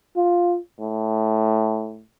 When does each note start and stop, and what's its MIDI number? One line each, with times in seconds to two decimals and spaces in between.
0.16 0.57 65
0.81 2.01 45